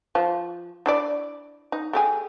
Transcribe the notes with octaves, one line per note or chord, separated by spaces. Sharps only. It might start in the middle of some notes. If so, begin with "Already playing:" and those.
F3 F4
D4 E4 D5
D#4
A3 G4 G#4